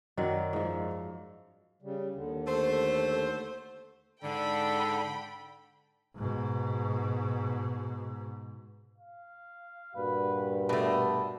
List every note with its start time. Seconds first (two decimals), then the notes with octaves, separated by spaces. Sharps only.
0.17 F#2 D#3 F#3 D5
0.53 G#2 F3
1.82 C#3 G3
2.15 D#2 D3
2.47 A3 A4 C5
4.23 G#2 D3 A4 G5 B5
6.16 G#2 B2
8.98 F5
9.96 G2 A#2 F#4 B4
10.69 B2 A3 D4